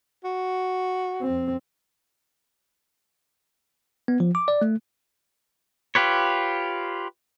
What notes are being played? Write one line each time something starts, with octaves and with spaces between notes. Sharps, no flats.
F#4
F2 C4
B3
F3
D6
D5
A3
F4 G4 B4 C#5